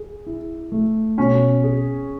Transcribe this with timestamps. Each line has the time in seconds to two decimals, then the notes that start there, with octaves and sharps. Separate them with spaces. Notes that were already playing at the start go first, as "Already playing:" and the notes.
Already playing: G#4
0.26 E4
0.72 A3
1.18 B2 C#4
1.63 G#4